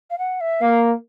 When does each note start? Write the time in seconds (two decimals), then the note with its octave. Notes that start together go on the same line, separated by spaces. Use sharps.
0.11 F5
0.19 F#5
0.41 E5
0.61 A#3 F5